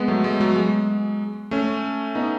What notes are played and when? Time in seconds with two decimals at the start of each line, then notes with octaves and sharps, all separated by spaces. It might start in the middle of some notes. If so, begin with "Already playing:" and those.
Already playing: G#3 B3
0.08 F#3 A3
0.24 G#3
0.41 F#3
0.56 G#3
1.51 A3 C#4
2.15 B3 D#4